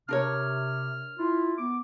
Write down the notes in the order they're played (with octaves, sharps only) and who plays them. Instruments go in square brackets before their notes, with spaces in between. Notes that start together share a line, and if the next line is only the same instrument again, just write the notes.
[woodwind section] C3 [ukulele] D4 A#4 C#5 [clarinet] F6
[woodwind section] E4 F4
[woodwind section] B3 [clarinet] D6